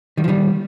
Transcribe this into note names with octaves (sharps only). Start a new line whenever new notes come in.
D#3 G3
F3
D#3 G3